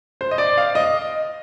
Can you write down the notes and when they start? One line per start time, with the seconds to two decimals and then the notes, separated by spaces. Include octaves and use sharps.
0.21 C5
0.31 D#5
0.38 D5
0.57 F5
0.75 D#5